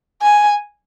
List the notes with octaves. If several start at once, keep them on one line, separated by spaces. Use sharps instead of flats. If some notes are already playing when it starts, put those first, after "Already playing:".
G#5